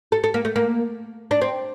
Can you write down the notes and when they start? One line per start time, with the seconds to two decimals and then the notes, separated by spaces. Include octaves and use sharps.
0.12 A4
0.24 A4
0.34 A#3
0.45 A3
0.56 A#3
1.31 D4
1.41 C4